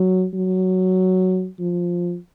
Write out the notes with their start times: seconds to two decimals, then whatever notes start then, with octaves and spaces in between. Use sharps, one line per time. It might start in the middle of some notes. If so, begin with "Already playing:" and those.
Already playing: F#3
0.34 F#3
1.60 F3